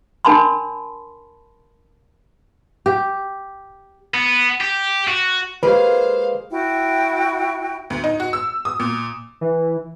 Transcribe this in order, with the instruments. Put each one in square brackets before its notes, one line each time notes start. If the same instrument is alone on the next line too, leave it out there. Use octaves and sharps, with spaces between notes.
[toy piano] D4 A#4 A5 B5 C6
[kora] G4
[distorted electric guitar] B3
G4
F#4
[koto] G#3 A#3 G#4 [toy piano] F4 G4 [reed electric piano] B4 [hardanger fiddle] C5 F5
[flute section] E4 F#4 G5
[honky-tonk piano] D2
D#4
F#4
E6
D#6
A#2
[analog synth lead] E3